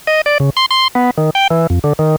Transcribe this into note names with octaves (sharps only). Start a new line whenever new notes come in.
D#5
D5
C#3
C6
C6
B3
D#3
G5
E3
F2
D3
D#3